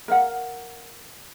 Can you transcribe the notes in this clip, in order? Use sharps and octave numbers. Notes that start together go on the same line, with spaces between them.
A#4 F5 F#5